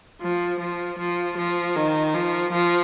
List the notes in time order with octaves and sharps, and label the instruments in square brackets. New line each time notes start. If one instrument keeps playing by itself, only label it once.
[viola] F3
F3
F3
F3
D#3
F3
F3